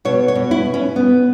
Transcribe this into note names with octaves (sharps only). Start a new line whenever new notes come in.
B2 C#5
C#5
B2
E4
B2
C#4
B2 B3